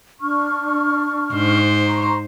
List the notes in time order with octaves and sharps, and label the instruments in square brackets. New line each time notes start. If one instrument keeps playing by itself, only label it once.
[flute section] D4 C#6 F6
[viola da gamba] G#2 C5
[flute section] A#5 C6 C#6